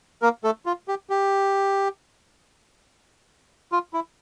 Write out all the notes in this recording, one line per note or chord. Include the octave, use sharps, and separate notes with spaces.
A#3 A#4
A3 A4
F4
G4
G4
F4
E4